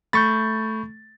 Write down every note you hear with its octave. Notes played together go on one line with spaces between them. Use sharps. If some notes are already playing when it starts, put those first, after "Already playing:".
A3 B5 C#6 G6 A6